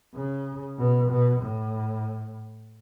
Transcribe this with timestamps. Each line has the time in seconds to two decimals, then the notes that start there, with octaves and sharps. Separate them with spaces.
0.15 C#3
0.78 B2
1.10 B2
1.42 A2